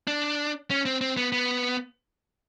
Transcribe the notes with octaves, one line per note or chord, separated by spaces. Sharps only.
D4
C#4
C4
C4
B3
B3